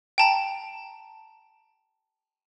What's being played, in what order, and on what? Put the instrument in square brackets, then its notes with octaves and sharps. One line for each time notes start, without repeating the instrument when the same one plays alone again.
[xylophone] G5 A5 A#5